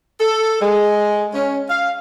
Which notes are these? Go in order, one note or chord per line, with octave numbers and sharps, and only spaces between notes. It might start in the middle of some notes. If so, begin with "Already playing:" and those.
A4
G#3
C#4
F5